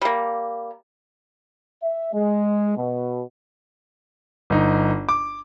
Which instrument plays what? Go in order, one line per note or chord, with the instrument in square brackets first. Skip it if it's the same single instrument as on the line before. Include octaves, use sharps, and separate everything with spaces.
[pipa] G3 A#3
[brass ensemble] E5
G#3
B2
[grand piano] G1 D#4
D6